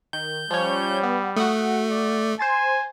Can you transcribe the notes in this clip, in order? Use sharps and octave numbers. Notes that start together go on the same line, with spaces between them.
D#3 G6
F3 G3 C#4 C#5
B3
A3 F#4 F#5 D#6
D5
C5 G#5 C6 A6